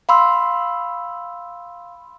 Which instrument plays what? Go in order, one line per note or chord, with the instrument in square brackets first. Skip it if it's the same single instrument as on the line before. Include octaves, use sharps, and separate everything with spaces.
[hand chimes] F5 B5 C6 E6